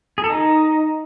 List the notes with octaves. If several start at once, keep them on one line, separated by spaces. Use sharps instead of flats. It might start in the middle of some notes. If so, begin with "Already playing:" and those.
G#4
A4
D#4